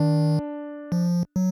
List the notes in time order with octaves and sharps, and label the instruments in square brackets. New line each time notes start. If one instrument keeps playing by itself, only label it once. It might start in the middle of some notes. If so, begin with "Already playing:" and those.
Already playing: [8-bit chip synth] D#3 [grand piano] D4
[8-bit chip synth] F3
F#3